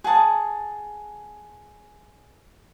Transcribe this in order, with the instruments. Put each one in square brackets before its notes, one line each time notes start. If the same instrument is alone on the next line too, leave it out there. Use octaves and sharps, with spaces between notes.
[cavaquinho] G#4 F#5 A5 D#6